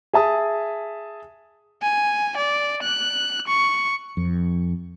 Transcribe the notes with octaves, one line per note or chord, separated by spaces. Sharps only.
G#4 E5 A5 D#6
G#5
D5
F#6
C#6
F2